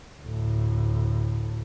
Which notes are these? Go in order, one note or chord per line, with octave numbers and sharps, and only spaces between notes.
D2 A2